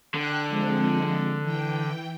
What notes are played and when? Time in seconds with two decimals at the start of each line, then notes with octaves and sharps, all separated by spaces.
0.14 D3 G5 F#6
0.49 F3 G#3 C4
1.42 E3 G5